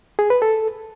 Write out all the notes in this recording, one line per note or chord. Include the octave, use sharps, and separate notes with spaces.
G#4
B4
A4